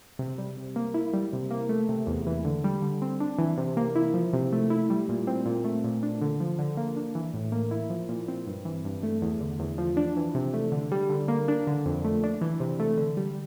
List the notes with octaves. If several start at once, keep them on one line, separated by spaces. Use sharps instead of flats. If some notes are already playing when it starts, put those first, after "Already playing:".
C3
G3
C3
A#3
E4
G3
C3
A#3
A3
C3
E2
E3
D3
G3
D3
C4
D4
E3
C3
A#3
E4
F3
C3
A3
E4
G3
A#2
C4
A#2
A3
A#2
D4
D3
F3
D3
A#3
D4
E3
A2
A#3
E4
F3
A#2
C4
G2
E3
G2
A3
E2
D3
E2
F3
D4
E3
C3
A3
D3
G3
D3
A#3
D4
D3
F2
A3
D4
E3
C3
A3
D3
G3